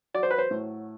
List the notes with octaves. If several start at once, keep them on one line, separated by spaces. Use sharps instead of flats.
F#3 D5
C5
B4
C5
A2